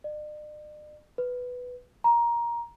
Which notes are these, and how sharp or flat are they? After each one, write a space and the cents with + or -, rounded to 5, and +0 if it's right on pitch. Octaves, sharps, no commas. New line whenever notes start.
D5 +45
B4 +5
A#5 +15